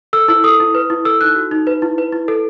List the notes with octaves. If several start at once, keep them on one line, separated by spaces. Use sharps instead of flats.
A4 E6
E4 E6
A4 D#6
E4
B4
E4
A4 E6
D#4 F#6
F#4
D#4
B4
E4
B4
E4
A4